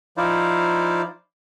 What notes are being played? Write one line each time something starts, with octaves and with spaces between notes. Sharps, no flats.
F3 D#4 E4 C5 D5 F5